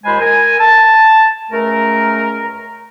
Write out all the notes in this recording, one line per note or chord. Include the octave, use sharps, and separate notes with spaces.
D#2 G#3 F4 C5 G#5 B5
A#4 G#5
A5
C#2 A3 C#4 A#4